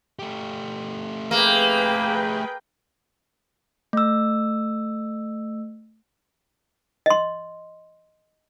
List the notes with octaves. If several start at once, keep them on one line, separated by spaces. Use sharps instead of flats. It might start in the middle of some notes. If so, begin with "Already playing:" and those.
A3 G4
A#3 G#4 B4 G5
A3 E6
D#5 C6